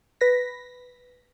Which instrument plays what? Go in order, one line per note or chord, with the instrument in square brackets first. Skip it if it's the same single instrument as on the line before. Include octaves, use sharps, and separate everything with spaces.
[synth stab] B4 A#6 B6